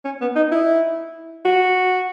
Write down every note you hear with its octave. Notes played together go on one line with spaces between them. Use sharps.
C#4
B3
D#4
E4
F#4